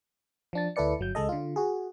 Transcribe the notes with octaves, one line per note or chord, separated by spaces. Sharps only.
F3 D4 A6
D2 E4 A4 B4 D5 C#7
G1 F#3 G6
C#2 G#3 A4 D#5
D3 F4
F#4 G#4